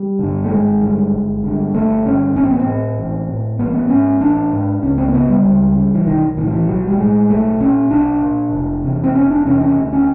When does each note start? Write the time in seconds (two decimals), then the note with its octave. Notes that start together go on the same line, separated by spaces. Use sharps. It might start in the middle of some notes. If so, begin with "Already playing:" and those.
Already playing: G3
0.19 G2 D3
0.44 A3
0.51 G#1 G#3
0.81 G2 D3
1.12 G1
1.43 G2 D3
1.74 G1 A3
2.05 G2 D3 C#4
2.36 A1 C#4
2.44 C4
2.51 B3
2.59 C4
2.66 A2
2.98 A1
3.29 A2
3.59 A1 B3
3.67 A#3
3.74 B3
3.89 G#2 C#4
4.21 A1 D4
4.52 G#2
4.83 C#2 C#4
4.98 C4
5.08 A#3
5.13 C#3 B3
5.30 G3
5.45 C#2
5.76 C#3
5.94 E3
6.06 B1 D#3
6.37 A2 D#3
6.47 F3
6.52 E3
6.68 B1 F#3
6.88 G3
6.98 A2 G#3
7.29 B1 A3
7.60 A#2 C#4
7.91 B1 D4
8.22 A#2
8.53 F1
8.84 E2 C3
9.04 C4
9.14 F1 C#4
9.31 D4
9.45 E2 C3 C#4
9.61 C#4
9.76 D2
9.93 C#4